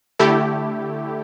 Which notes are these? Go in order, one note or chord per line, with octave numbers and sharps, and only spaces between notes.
D3 A3 E4 G4